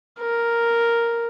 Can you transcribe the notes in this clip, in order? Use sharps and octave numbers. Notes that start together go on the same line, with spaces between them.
A#4